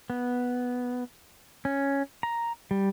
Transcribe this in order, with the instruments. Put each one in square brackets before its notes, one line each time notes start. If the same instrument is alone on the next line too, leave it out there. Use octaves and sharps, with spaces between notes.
[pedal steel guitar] B3
C#4
A#5
G3